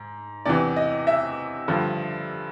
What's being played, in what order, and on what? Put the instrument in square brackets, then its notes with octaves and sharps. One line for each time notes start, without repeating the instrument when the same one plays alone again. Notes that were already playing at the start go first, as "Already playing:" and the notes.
Already playing: [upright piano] G#2
E2 C3 E3 D5
D#5
E5
G2 D3 F3